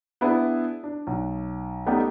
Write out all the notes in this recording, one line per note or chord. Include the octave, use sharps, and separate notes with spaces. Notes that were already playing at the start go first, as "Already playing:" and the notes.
B3 D4 E4 G#4 B4
D4
B1
G3 A3 B3 C#4 D#4 G4